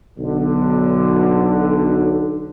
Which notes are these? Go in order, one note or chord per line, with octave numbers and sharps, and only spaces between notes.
B1 D3